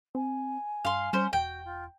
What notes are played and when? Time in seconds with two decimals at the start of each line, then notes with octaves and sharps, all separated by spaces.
0.15 C4 G#5
0.85 G2 F5 C6
1.13 G3 C#4 C5
1.33 E1 F#4 G5
1.65 F4